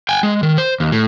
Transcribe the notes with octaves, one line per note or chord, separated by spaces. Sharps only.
G5 G#5
G#3
D#3
C5
D#2
A2